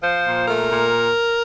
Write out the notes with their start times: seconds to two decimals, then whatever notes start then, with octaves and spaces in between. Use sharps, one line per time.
0.03 F3 C5
0.26 A#2
0.48 A3 A#4
0.70 A#2